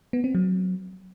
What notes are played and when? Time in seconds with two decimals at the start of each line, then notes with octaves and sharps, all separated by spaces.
0.13 B3
0.24 C4
0.35 F#3